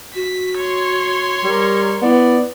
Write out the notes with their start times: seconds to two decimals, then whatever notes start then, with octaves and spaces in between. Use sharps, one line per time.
0.15 F#4 B6
0.57 C#5 C6
1.43 G3 A#4
2.02 B3 E4 D5